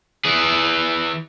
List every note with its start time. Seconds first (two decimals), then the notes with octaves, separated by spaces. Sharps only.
0.25 E3 G#4